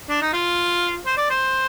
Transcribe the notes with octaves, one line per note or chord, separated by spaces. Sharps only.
D4
D#4
F4
C5
D5
C5